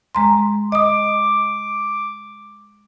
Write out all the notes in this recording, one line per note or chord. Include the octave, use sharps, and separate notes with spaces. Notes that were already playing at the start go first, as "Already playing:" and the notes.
G#3 A#5 C6
D#5 D6 D#6